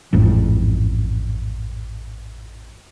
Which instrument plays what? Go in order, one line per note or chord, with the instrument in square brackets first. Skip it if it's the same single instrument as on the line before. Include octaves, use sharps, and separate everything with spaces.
[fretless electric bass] A1 F2 G#2